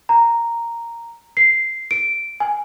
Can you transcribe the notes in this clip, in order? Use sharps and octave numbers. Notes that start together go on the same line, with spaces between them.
A#5
C7
D7
G#5